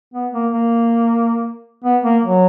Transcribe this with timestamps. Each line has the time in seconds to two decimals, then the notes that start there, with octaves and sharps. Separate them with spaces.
0.14 B3
0.33 A#3
0.52 A#3
1.84 B3
2.04 A#3
2.23 F#3